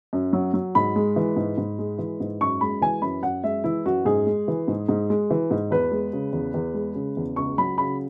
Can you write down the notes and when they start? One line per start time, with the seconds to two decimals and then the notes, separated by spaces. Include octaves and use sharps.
0.13 F#2
0.33 F#3
0.54 F#3
0.75 G#2 B5
0.96 G#3
1.16 E3
1.36 G#2
1.57 G#2
1.79 G#3
1.98 E3
2.20 G#2
2.41 F#2 C#6
2.61 G#3 B5
2.81 E3 G#5
3.02 F#2 B5
3.23 F#2 F#5
3.44 G#3 E5
3.64 E3 E4
3.86 F#2 F#4
4.05 G#2 G#4
4.27 G#3
4.48 E3
4.68 G#2
4.89 G#2
5.10 G#3
5.30 E3
5.51 G#2
5.71 E2 B4
5.91 G#3
6.13 C#3
6.33 E2
6.54 E2
6.74 G#3
6.95 C#3
7.17 E2
7.36 C#2 C#6
7.58 F#3 B5
7.78 C#3 B5